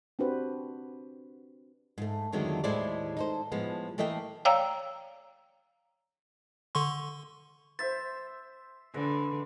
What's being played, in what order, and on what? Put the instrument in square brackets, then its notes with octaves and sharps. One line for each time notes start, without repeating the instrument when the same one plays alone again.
[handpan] C4 D4 F#4 G4 B4 C5
[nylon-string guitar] G#2 A3
F2 D3 D#3 F#3 G#3 A3
D#2 A2 G#3 E4 C5 D5
D#4 A4 C5
A2 F3 G#3 B3
E3 A3 A#3 D#5 E5 G5
[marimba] C#5 D5 F5 G5 A#5 E6
[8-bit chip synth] D3 C6 C#6
[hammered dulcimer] C5 E5 [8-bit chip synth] A6
[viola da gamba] D3 [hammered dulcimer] E3 G#3